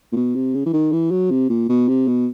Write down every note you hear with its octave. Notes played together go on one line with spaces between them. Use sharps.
A#2
B2
C3
C#3
E3
D#3
E3
F#3
C3
A#2
B2
C3
B2